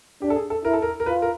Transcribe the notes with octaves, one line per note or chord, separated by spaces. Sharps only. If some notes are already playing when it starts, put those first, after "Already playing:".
D4 G4
A4
G#4
A4
E4 A#4
A4
A#4
A#4
F4 B4
A#4